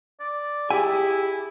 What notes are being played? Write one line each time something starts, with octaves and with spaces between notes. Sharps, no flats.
D5
E4 G4 G#4 G#5